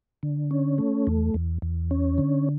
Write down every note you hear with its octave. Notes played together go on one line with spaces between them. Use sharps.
D3
C#4
A3
E2
E2
E2
C#4
D3